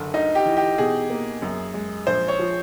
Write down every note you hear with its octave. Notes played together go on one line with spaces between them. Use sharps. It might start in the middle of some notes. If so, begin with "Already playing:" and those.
Already playing: F#1 D3
D2 D#4
G4
E3
G4
B2 G#4
A#3
F#2
G#3
A#1 C5
C#5
F3